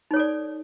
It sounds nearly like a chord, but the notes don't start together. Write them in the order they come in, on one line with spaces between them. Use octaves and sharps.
D#4 C#5 A4 D5